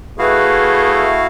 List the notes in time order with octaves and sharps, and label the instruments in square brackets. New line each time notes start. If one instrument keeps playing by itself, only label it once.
[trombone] A3 [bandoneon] E4 F#4 F5 [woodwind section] G#4 [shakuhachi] B4